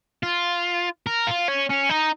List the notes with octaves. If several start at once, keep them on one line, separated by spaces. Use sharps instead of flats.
F4
A#4
F4
C#4
C#4
D#4